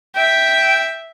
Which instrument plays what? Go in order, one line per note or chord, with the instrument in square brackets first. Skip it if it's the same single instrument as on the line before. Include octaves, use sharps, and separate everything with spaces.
[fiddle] E5 [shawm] G5